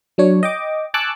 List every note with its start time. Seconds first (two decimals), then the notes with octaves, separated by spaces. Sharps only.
0.18 F#3 D4 C#5
0.43 D#5 G5 D6
0.94 G#5 A5 C#6 D6 E6 F#6